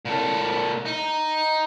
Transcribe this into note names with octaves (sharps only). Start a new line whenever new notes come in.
A#2 A4
D#4